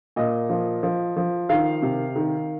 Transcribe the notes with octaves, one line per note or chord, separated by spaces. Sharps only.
A#2 D#5
F3
F3
F3
D#3 F5
C3
D#3